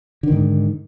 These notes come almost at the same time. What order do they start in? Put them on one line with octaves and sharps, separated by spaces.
D3 D#3 G#2